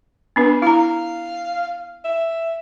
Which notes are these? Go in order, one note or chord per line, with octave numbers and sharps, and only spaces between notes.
B3 D4 B4
E4 F5 A#5
E5